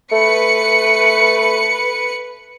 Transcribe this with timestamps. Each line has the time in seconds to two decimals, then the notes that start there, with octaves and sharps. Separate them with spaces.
0.12 A3 B4 C#7